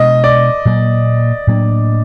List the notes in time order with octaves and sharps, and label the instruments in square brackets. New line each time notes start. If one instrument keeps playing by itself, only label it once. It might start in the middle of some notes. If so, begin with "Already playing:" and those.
Already playing: [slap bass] B2 G#3 B3 D4 [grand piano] D#5
[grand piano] D5
[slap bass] A#2 F#3 A#3
A2 F#3 A#3 D4